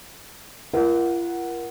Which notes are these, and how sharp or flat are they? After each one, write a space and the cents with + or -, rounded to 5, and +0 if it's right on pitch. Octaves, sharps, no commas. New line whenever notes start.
F4 -40 A#4 +25 F#5 +0